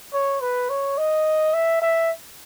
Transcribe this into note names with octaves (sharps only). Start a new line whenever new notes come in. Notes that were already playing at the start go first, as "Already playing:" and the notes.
C#5
B4
C#5
D#5
E5
E5